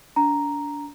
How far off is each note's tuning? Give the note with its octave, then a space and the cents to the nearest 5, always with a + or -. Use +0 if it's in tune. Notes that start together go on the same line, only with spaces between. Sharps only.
D4 -30 A#5 +0